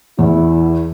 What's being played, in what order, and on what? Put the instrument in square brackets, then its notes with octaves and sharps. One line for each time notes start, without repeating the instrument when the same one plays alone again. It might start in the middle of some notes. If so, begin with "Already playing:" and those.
[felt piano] E2 [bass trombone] E4